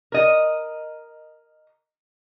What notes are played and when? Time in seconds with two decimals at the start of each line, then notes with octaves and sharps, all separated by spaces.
0.12 A#4 D#5